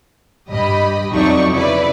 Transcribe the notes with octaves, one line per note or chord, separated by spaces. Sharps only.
G2 G4 D#5 B5
F2 F#3 A3 D#4 D5 C#6
C#3 E4 B4 D5